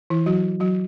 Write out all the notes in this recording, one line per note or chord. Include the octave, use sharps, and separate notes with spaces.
E3 E4
F#3 F#4
F#3 F#4